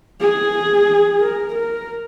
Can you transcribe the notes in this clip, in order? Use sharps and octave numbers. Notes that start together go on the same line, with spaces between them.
G#4
A#4
A#4